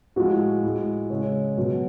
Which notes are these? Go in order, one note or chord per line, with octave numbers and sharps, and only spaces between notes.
A2 F3 G#3 F#4
A2 G#3
C#3 G#3 C#5
B2 F#3